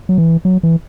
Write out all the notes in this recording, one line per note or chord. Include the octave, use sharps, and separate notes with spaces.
F#3
E3
F#3
E3